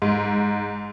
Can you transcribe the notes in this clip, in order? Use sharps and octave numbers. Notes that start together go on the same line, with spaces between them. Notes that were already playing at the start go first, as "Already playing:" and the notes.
G#2